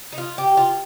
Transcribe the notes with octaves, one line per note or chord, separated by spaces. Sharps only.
D#4
F4
G4
F4